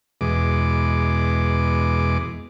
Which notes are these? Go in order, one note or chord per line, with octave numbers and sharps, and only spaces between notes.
E2 B2 G#3 D6